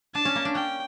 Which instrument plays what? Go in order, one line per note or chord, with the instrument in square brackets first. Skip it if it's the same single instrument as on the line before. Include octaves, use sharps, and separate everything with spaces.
[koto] D4 [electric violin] A5
[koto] C#4
A#3
D4
[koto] C#4 [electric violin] G5